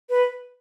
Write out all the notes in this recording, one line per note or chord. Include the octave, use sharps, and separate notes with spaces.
B4